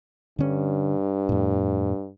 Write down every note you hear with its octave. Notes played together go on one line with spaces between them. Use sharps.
G2 D3 C#4
F2 A2